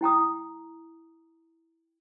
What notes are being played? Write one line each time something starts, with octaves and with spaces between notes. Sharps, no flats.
E4 G5 A#5 D#6